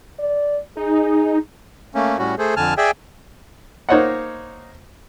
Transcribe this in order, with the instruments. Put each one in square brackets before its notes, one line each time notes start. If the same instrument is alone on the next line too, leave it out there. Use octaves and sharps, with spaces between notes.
[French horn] D5
[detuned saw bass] D#4 [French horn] G#4
[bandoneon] A3 A#3 C#4
A2 G3 C#4 F#4
A3 G#4 A4 C5
F2 D3 G#5 A5 F6
G#4 D5 E5 G5 G#5
[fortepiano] A#3 D#4 C5 C#5 D#5 F#5